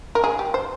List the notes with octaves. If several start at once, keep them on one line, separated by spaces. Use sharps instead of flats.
A#4
G#4
G4
C5